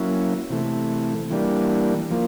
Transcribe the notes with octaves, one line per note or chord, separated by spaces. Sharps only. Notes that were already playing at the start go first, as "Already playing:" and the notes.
Already playing: F#3 A#3 C#4 E4
C3 E3 A3
E3 G3 A#3 D4
F3 A#3